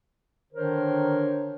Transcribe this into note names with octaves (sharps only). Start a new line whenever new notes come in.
D3 D#3 D4 A#4 C5 C#5